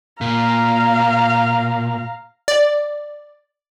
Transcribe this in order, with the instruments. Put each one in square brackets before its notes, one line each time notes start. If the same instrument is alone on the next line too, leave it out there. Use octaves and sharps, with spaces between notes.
[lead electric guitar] A#2 [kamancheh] F5 A#5
[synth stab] D5